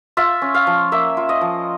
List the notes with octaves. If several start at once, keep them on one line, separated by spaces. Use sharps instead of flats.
F4 E5
C#4
F5
F3
A#3 E5
F4
D#5
F3